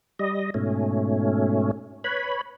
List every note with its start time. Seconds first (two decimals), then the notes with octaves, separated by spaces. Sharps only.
0.19 G3 D#5
0.54 G#2 B2 A3 C#4
2.04 B4 C#5 B5